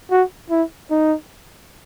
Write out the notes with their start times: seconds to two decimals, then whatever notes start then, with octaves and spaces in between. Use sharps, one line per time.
0.11 F#4
0.50 E4
0.91 D#4